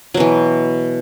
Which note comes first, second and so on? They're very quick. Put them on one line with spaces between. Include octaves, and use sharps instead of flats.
F#3 B2 E3